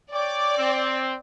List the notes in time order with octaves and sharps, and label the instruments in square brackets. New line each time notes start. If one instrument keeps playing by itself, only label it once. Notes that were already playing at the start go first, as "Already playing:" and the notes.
[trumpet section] C#5 G5 D6 [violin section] D5
[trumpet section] C4